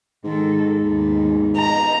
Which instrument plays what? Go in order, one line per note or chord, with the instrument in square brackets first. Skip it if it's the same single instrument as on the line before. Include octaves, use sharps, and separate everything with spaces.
[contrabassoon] G#2 [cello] D#3 A4
[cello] D#2 B3
[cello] B3 D#5 [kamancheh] A#5